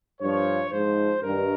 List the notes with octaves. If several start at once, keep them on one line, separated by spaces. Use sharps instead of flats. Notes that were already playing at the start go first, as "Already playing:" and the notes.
G2 F3 C#5
G#2 F3 C5
G2 D#3 A#4